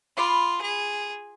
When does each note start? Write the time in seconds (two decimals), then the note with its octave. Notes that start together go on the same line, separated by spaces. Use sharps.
0.17 F4 B5 C6 D6
0.62 G#4